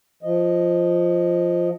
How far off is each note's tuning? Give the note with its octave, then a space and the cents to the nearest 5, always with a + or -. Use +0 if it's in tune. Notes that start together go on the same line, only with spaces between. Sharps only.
F3 +0 D#5 +0